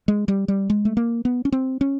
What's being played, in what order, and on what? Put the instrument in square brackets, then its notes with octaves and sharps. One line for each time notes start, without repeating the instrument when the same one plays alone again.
[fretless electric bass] G#3
G3
G3
G#3
A3
A#3
B3
C#4
C4
C#4